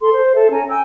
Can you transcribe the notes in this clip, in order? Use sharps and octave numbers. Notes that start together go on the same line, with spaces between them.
A4 C6
C5
A4 E5
C#4 G#5 A#5
G5 G#5 E6